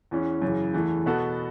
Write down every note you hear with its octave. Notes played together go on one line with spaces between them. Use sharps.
E2 E3 C#4
F#2 C#3 E3
E2 E3 A3
B2 B3 F#4 A4